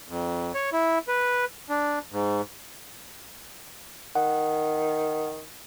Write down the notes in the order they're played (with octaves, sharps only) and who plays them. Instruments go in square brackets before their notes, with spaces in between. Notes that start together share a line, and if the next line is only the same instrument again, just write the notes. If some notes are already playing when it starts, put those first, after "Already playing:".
[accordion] F2
C#5
E4
B4
D4
G#2
[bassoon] D#3 [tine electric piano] F#5